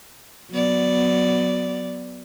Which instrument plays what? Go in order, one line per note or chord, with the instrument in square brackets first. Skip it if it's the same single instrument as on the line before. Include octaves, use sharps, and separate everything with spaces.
[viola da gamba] F#3 B3 D5